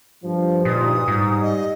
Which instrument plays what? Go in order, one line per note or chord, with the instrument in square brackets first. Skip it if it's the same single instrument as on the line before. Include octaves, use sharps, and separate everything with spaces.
[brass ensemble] G2 F3
[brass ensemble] D2 G2 D#4 [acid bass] A#2 [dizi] D#6
[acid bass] G#2 [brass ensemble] G3
[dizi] D#5